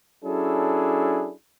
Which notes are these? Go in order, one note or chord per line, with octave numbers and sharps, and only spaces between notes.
F#3 C#4 D4 E4 G#4 A4